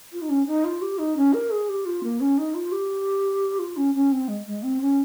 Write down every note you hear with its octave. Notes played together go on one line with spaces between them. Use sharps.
F4
D#4
C#4
D#4
F4
G4
D#4
C#4
A#4
G#4
G4
F4
A#3
C#4
D#4
F4
G4
F4
C#4
C#4
C4
G#3
G#3
C4
C#4